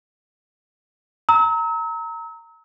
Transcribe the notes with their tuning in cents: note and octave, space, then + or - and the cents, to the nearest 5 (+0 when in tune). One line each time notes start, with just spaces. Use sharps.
A#5 -15 E6 -40